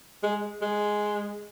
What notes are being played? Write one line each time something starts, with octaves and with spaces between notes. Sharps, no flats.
G#3
G#3